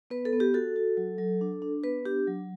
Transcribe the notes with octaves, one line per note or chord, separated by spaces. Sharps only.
B3 B4
A4
B3
G4
F#4 A4
F#4
F#3
F#3
D4
D4
B3 B4
D4 G4
F#3